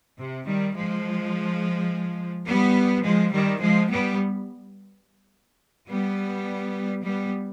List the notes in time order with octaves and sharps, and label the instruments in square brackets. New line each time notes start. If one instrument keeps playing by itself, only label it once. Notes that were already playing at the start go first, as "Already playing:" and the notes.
[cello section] C3
D#3 G3
F3 G#3
G3 B3
F3 G#3
D#3 G3
F3 G#3
G3 B3
G3 B3
G3 B3